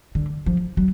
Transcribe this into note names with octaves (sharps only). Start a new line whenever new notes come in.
D3
F3
F#3